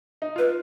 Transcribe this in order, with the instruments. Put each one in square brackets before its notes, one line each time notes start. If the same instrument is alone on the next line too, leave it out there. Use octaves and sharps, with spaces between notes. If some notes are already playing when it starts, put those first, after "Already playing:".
[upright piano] D#4
[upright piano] F4 [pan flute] B4